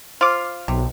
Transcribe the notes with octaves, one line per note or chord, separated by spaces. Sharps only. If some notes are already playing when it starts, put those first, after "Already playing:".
F4 C5 C6 D6 F6
B1 C3